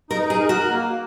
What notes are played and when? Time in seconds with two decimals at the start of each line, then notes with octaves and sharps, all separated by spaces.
0.10 D#4 A#4
0.30 G#4
0.40 A#4
0.49 F#4
0.69 A#3